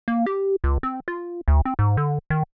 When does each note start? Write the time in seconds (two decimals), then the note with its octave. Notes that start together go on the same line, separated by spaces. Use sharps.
0.08 A#3
0.26 G4
0.64 C#2
0.83 C4
1.08 F4
1.48 D2
1.65 C4
1.79 G#2
1.97 D3
2.30 D#3